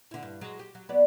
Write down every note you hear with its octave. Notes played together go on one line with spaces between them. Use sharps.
D3 E4
G2
F#3 G#3
G4
F#3
F#3 B3 D5